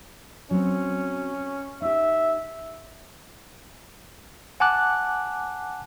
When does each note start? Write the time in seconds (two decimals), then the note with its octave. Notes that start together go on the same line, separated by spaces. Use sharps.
0.51 F#3 C4 C#4
1.82 D#4 G4 E5
4.60 F#5 G#5 A5 D6 F#6